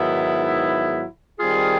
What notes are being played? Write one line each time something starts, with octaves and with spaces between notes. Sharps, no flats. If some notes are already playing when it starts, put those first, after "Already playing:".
Already playing: G#2 D#3 F#3 B3 E4
D#3 G3 C4 F4 G#4